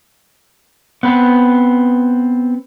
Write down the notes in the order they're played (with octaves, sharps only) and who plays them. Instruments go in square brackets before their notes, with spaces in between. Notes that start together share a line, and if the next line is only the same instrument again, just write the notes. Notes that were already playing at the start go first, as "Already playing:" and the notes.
[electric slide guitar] B3 C4 B4